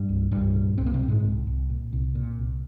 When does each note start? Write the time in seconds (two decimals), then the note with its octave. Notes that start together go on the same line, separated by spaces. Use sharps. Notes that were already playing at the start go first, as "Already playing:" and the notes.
Already playing: G2 G3
0.09 C2
0.31 C2 G2 G3
0.55 A#2
0.78 C2 C4
0.86 A#3
0.94 C3 C4
1.01 A#2
1.08 G#2 G#3
1.24 C2
1.47 C2
1.69 A#2
1.93 C2
2.15 A#2
2.38 C2